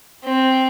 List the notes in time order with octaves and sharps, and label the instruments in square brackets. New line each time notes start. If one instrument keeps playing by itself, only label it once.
[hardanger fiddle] C4